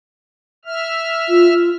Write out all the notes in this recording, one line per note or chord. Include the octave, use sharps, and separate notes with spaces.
E5 F6
F4